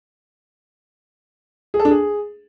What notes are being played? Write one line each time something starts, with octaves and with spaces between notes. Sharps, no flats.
G#4
A4
D4
G#4